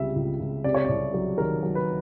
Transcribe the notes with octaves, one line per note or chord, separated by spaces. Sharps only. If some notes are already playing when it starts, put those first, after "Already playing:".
Already playing: C#2 C3 G3 E5
C#2
C#2
C3 D5
C#5
C2 D5
F#3
D#3 A#4
F#3
B4